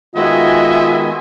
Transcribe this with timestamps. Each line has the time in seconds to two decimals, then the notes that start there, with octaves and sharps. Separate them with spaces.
0.15 D#3 G#3 B3 F4 F#4 D#5 E5 G#5